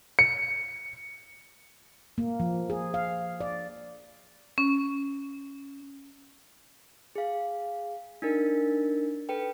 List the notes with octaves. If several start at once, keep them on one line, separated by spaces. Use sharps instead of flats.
C#7
A#3
F3
G#4
F5
D5
C#4
G#4 F5
D4 D#4 A#4
A4 B4 G5